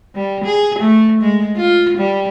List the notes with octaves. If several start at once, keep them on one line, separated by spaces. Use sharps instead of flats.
G3
G#4
A3
G#3
F4
G3